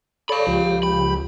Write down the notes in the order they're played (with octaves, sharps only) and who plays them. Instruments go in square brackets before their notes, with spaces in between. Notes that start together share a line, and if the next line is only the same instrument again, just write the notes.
[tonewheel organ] A4 C#5 D5 [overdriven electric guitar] F5 B5
[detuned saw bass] C#2 [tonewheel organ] F3 G4
[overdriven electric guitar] B5